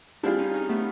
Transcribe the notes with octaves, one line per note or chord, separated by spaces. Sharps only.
G3 C4 D4 E4 F4 G#4
C#4 D#4
C#4 D#4
A3 B3